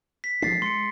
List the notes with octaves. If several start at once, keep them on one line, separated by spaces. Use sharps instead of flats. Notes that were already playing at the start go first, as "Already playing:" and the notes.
B6
F3 A3 D4 A6 C7
G#3 C6 C#7